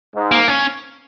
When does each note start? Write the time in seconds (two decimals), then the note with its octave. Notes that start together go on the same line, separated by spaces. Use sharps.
0.15 G#2
0.31 A#3
0.48 C#4